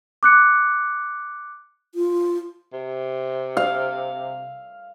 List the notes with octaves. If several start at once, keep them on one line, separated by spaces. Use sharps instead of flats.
D6 F#6 C#7
F4
C3
F5